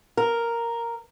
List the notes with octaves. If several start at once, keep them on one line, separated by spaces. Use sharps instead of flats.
A#4